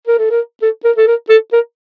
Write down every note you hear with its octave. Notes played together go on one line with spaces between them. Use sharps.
A#4
A4
A#4
A4
A#4
A4
A#4
A4
A#4